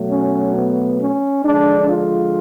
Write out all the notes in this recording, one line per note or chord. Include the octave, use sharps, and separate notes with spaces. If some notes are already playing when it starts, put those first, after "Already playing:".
Already playing: B2 F#3 A3
C#4
B3
C#4
D3 F3 G#3 D4
F4